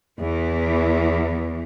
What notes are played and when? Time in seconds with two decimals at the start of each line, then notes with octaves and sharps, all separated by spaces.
0.19 E2 E3